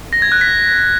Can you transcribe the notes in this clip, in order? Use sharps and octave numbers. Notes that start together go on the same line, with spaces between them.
A#6
G#6
F#6
B6